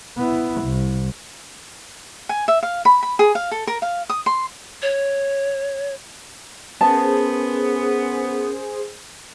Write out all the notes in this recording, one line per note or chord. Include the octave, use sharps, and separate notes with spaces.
B3 E4
C2
G#5
E5
F5
B5
B5
G#4
F5
A4
A#4
F5
D#6
C6
C#5
B3 C#4 G#4 A#4 C5 A5